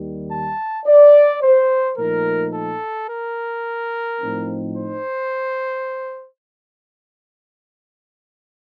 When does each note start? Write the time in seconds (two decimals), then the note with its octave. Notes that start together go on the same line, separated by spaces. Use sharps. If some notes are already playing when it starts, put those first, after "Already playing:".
Already playing: D#2 D#3 G3
0.30 A5
0.86 D5
1.42 C5
1.97 A#2 F3 A3 D#4 A#4
2.53 A4
3.09 A#4
4.21 A2 F3 C4 D#4
4.77 C5